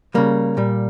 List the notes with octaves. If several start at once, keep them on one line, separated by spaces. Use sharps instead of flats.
C#3 G3 A#3
A#2 G3